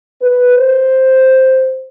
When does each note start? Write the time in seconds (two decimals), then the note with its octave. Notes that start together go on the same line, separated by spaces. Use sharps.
0.22 B4
0.57 C5